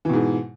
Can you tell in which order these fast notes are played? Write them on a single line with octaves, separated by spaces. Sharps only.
E3 B2 G#2